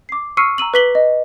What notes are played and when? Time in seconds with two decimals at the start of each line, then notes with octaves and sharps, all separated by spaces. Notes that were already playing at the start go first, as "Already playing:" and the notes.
0.09 D6 C7
0.37 C#6 E6 F6 C7 C#7 D#7
0.58 A#5 E6 D#7 F#7
0.74 B4 D6 B6 F#7 G7
0.95 D#5